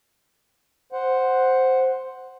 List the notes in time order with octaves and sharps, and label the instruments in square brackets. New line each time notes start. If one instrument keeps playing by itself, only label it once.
[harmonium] C5 F#5